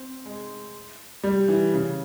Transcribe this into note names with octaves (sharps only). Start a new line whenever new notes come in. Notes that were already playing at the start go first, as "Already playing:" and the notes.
Already playing: C4
G#3
G3
E3
C#3